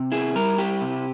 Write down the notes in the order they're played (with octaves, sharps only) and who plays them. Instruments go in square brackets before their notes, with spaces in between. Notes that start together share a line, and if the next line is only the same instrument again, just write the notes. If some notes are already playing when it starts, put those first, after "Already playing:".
Already playing: [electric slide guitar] C3
E4 G#4
G3 A#4
E4 G4
C3